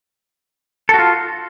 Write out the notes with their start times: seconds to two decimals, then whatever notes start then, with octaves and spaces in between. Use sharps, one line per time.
0.89 A4
0.94 F#4
0.99 F4